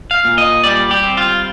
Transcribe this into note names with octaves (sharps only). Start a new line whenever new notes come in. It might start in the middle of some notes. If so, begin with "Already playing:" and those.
F5
A#2
D#5
G3 D5
G4
C4
F4